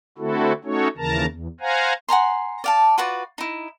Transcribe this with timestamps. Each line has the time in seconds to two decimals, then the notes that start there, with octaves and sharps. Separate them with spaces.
0.18 D3 A3 C4 E4 F#4 A4
0.64 A3 C#4 D#4 F#4 A4 C#5
0.97 D#2 C#3 E3 A#4 A5 A#5
1.28 E2
1.60 C5 F5 F#5 G#5 A#5
2.09 F#5 G#5 A#5 C6
2.64 D5 F5 A5
2.98 F4 F#4 B4 D5
3.38 D#4 E4